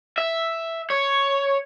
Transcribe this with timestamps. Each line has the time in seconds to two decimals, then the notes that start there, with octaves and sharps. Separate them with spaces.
0.18 E5
0.90 C#5